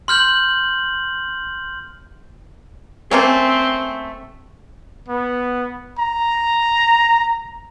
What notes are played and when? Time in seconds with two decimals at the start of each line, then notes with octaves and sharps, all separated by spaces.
0.08 C6 F6 G6 F#7
3.11 A3 A#3 C4 C#4
5.08 B3
5.99 A#5